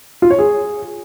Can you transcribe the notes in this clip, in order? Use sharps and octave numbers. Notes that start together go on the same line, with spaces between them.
F4
C#5
G#4